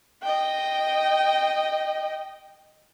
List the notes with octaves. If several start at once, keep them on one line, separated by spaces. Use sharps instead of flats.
D#5 G5